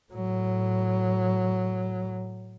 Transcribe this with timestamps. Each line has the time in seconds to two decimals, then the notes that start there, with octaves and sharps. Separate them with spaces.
0.12 A2 F#3